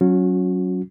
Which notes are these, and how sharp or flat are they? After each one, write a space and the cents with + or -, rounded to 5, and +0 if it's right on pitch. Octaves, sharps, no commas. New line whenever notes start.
F#3 +10 C#4 +0 F#4 -30